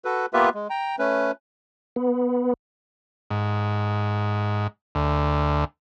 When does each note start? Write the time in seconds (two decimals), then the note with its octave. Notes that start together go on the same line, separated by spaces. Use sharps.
0.05 F#4 A4 B4
0.34 A#3 B3 F4 G4 B4 E5
0.54 G#3
0.70 G5 A#5
0.99 A3 C#4 B4
1.96 B3
3.30 G#2
4.95 D2